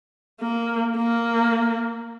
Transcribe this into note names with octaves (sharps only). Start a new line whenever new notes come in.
A#3
A#3